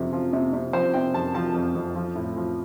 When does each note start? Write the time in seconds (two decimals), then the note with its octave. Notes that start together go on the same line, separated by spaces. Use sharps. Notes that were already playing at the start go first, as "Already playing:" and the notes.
Already playing: F2 C3 F3
0.13 F3
0.33 C3
0.53 C3
0.73 F3 C5
0.94 C3 G5
1.14 F2 A5
1.34 F3 A5
1.54 F2
1.75 F2
1.95 F3
2.16 A2
2.36 F3